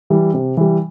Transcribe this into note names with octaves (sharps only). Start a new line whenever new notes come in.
E3 G3
C3
E3 G3